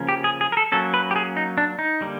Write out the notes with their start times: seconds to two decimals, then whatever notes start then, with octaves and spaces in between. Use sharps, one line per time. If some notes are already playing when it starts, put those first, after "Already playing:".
Already playing: C#3 F3 A#3 C#4
0.09 G4
0.24 G#4
0.41 G#4
0.52 A#4
0.57 A4
0.72 F#3 A#3 C#4 A4
0.94 B4
1.11 G4
1.16 G#4
1.37 D#4
1.58 D4
1.79 D#4
2.01 D3 G3 A#3